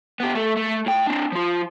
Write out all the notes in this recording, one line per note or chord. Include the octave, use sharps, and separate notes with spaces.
B3 G4
A3
A3
A2 G5
C4 D4
F3 F4